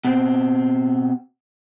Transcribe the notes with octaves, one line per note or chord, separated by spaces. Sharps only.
B2 C4